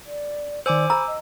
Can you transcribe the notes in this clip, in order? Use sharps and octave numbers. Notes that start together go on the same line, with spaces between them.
D5
D#3 C5 D5 G#5 D6 E6
A#5 B5 E6
D#5